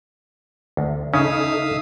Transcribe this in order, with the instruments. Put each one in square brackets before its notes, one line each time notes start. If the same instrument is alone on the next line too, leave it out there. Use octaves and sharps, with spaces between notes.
[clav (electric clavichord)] D2
[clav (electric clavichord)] C#3 C#4 [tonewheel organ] D#4 A4 [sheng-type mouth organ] E5 F5 D#6